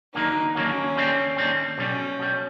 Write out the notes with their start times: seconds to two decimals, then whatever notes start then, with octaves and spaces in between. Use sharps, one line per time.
0.14 D#2 D3 F#3 A#3 D#4
0.55 D#2 D3 F#3 A#3 C#4
0.96 D#2 D3 G3 C4
1.36 D#2 D3 G3 C4
1.77 B1 B2 G3 C#4
2.18 B1 B2 G3